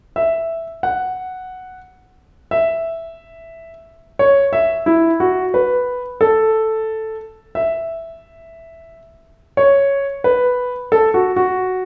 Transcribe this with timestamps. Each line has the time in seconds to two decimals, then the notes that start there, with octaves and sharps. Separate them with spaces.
0.16 E5
0.83 F#5
2.51 E5
4.19 C#5
4.53 E5
4.86 E4
5.20 F#4
5.54 B4
6.21 A4
7.55 E5
9.57 C#5
10.24 B4
10.92 A4
11.14 F#4
11.36 F#4